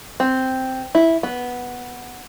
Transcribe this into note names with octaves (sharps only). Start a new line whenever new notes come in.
C4
E4
B3